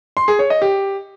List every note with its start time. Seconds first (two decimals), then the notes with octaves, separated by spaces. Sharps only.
0.17 C6
0.28 G#4
0.39 C#5
0.50 D#5
0.62 G4